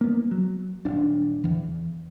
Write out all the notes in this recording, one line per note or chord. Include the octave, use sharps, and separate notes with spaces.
A#3 B3
F#3
D#1 D4
E2 E3